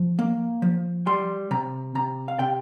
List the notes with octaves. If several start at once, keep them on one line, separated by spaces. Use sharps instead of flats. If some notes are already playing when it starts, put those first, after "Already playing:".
Already playing: F3
A#3
F3
G3 C6
C3 A#5
C3 A#5
F5
C3 G5